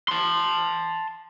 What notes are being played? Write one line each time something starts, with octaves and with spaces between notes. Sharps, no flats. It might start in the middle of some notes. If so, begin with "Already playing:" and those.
A5 C6